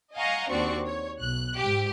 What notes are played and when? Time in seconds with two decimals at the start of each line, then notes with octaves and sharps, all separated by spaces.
0.14 D#5 F5 F#5 G#5 A#5 C#6
0.49 D#2 C4 D4 F#4 D5 C#6
0.86 C#5
1.19 B1 F#6
1.56 G#2 G4